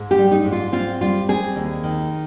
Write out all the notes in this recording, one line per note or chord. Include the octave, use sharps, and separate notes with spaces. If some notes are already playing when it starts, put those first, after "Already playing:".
Already playing: G#2
G4
G3
D#4
G#2
F4
C4 F4
G3 F4
C4 G#4
D#2
D#3